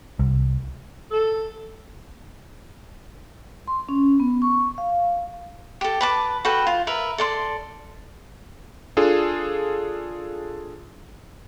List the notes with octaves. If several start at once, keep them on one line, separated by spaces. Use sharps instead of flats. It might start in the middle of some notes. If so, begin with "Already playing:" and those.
C2
A4
C6
C#4
B3
C#6
F5
G4 A4
B4 A5 D6
F#4 A4 B4 G5
F4
A#4 B4 E5
A4 D5 C6
D4 F4 G#4 A4